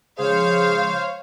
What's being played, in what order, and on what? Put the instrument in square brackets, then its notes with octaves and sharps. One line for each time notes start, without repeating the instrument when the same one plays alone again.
[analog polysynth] C#3 F3 G#3 [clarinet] G#4 [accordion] C5 [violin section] C#5 F5